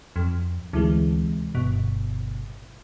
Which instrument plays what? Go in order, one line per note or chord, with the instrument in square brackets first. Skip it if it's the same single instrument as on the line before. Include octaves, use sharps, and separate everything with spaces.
[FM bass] F2
[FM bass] D2 [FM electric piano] C3 E3 G#3
[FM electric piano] G1 [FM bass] B2